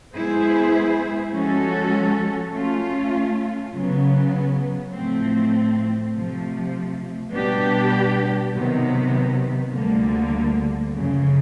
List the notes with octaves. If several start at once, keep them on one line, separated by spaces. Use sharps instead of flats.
G#3 B3 E4 G#4 C5
F3 G#3 C#4 F#4 A4
A3 C#4 F4
C#3 F#3 B3
A2 F3 A3 C4
C3 F3 A3
B2 G3 B3 D4 G4
C3 D#3 F#3 B3
D2 D3 G3 A#3
F#2 C#3 F3